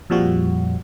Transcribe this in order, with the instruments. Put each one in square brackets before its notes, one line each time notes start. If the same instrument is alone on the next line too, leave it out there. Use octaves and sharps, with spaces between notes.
[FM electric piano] F2 A#2 F3 G3 F#4